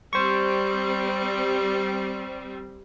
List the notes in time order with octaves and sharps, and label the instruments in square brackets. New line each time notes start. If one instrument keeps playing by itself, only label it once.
[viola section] G3 C4 [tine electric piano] C5 C#6